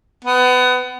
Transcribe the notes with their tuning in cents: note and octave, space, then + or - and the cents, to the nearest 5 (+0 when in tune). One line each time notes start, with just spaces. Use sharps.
B3 +25